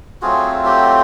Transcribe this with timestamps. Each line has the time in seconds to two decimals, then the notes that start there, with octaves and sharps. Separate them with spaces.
0.22 F#3 A3 C4 F4 F#4 G#4
0.65 G4